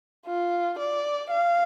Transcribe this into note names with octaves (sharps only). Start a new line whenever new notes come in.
F4
D5
F5